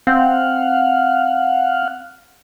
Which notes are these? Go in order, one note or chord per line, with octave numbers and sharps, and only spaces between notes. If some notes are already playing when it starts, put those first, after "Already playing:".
C4 F5 F#5